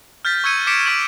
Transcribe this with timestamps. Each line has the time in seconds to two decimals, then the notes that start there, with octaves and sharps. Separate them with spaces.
0.25 F6 G6 A6 B6
0.44 C#6 E6 G#6 C#7 D#7
0.67 D6 B6 C#7 D7 E7
0.86 C#6 G#6 B6 D7 F#7